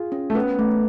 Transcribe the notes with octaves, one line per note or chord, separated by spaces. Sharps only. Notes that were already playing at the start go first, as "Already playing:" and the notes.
Already playing: F4 G#4
C#4
A3
B3 C#4
A3